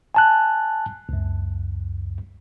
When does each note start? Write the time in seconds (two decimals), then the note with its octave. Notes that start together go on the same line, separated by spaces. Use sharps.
0.15 G#5 A5 F#6
1.09 C#2 F#2